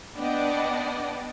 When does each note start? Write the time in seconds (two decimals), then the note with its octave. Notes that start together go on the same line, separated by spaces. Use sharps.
0.15 B3 D4 D5 D#5 F#5 G5